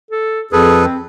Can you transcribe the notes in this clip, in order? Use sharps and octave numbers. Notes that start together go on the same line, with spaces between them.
A4
F2 G#4 A4 B4
C4